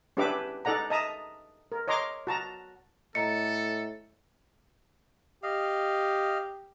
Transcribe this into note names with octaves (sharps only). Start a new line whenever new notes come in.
C#4 D4 G4 B4 E5 D6
D#4 A4 D5 F#5 A#5
D#5 E5 A5 A#5 D#6
A#4
C#5 D#5 A#5 C6 D6
F#4 A5 A#5
A2 A4 D#5 A#5 C#7
G4 D#5 F5